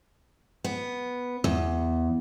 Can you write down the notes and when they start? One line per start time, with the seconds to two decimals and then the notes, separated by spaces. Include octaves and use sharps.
0.64 B3
1.44 E2